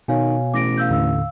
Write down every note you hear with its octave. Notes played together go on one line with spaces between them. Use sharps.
B2 D#3 C#5 F5 G#5
A1 D6 A#6 D7
F5 E6 G6
D#2 A2 D3 F5 E6